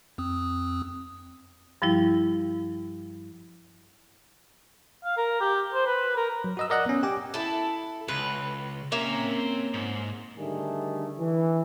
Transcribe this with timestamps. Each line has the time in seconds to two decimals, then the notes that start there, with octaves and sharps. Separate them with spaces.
0.18 F2 C4 D#6
1.82 G2 F3 G3 E4
5.04 F5
5.17 A#4
5.40 G4
5.74 C5
5.86 B4
6.17 A#4
6.44 F#3
6.57 F#4 D#5 E6
6.70 A#4 D5 D#5 F#5 E6 F#6
6.86 B3 C#4
7.03 G4 G5 G#5 D6
7.34 E4 A4
8.08 C#2 B4
8.92 A#3 C4 C#4 E5 A#5
9.74 G#2
10.37 D3 D#3 G3 A3 G#4
11.19 E3